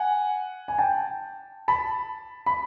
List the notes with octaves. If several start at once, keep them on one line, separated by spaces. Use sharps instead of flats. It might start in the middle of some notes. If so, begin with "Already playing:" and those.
Already playing: F#5 G#5
G#5
G5 A5
A5 B5
B5